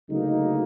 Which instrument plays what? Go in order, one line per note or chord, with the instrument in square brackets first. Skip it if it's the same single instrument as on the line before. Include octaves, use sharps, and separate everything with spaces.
[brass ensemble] D2 C#3 F#3 A#3 D#4